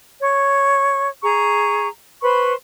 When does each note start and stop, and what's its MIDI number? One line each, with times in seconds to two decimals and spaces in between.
0.21 1.08 73
0.21 1.08 85
1.23 1.88 68
1.23 1.88 82
1.23 1.88 85
2.22 2.53 71
2.22 2.53 72
2.22 2.53 83
2.22 2.53 85